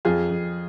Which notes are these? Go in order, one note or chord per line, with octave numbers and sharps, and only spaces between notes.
F2 F4 G#4
F2